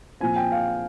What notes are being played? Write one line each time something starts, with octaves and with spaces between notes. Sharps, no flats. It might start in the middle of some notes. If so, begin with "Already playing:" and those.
A#2 F3 C4 G#5
G5
F5